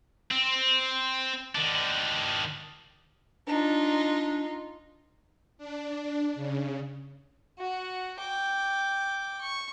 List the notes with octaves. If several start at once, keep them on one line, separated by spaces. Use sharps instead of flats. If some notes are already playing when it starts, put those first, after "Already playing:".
C4
D#3 D4
D4 D#4 F4
D4
C#3
F#4 F#5
G5 D6
C#6